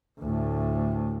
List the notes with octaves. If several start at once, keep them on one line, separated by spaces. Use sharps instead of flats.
D2 A2